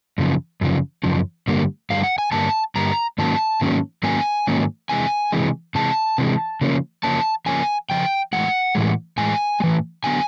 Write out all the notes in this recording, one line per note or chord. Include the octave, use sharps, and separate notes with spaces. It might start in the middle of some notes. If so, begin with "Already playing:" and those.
F#2 C#3 F3
F#2 C#3 F3
F#2 C#3 F3
G2 D3 G3 A#3
G2 D3 G3 F5
F#5
G#5
G2 D3 G3 A#3 A5
G2 D3 G3 A#3 A#5
G#2 D#3 F#3 A#3 C#4 A5
G#2 D#3 F#3 A#3 C#4
G#2 D#3 F#3 A#3 C#4 G#5
G#2 D#3 F#3 A#3 C#4
C3 E3 G#3 G#5
C3 E3 G#3
C3 E3 G#3 A5
C3 E3 G#3
C#3 F3 A#3 C#4
C#3 F3 A#3 C#4 A5
C#3 F3 A#3 C#4 G#5
C#3 F3 G5
A2 E3 G#3 F#5
A2 E3 G#3
A2 E3 G#3 G#5
G#3
A2 E3
D3 F#3 B3 G#5